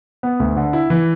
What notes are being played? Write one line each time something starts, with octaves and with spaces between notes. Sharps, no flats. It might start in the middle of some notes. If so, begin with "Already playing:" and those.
B3
D2
D3
E4
E3